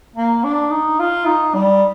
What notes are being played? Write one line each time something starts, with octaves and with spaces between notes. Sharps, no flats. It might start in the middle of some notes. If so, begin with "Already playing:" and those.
A#3
D4
D#4
F4
D#4
G3